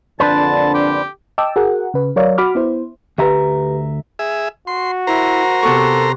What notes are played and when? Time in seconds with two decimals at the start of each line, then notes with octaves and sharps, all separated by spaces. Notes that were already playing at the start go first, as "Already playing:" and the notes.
0.20 F2 A#2 D3 D4 B4 C5 A5
0.74 G4
1.38 D#5 G5 A5 D6 E6
1.56 F#4 G#4 A#4 F#5
1.94 C#3 B4
2.16 F#3 A#4 C#5 D5 F5
2.38 F#4 B5 D6 F6
2.55 B3 E4 C5
3.18 D2 G4 B4 E5 A#5
4.19 G#4 E5
4.67 F#4 C6
5.07 E4 A#4 C5 A#5
5.63 C3 B3 A4 C#6